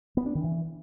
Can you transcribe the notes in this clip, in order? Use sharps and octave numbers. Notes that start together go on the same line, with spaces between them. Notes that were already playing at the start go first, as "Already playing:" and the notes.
B3
D4
D#3
E3